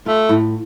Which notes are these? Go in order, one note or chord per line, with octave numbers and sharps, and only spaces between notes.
A3 F4
A2